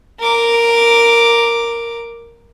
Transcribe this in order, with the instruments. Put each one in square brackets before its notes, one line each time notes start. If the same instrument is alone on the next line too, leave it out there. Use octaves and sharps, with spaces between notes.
[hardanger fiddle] A#4 D6